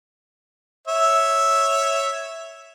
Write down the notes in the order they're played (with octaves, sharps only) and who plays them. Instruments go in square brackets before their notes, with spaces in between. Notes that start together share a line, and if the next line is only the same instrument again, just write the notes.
[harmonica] C#5 E5